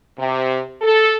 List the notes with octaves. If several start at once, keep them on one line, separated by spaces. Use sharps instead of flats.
C3
A4